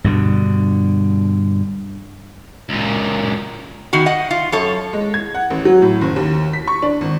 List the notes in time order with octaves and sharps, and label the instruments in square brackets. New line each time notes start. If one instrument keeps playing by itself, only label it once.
[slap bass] G2 B2 D3
[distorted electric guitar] C#2 A#2
[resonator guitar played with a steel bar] D#3 B3 F#4
D#5 F#5
F4
F#2 A4 C#5
[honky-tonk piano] G#3
G#6
F#5
A1
F#3
A2
F#1
D#2
B6
C#6
D4
G#1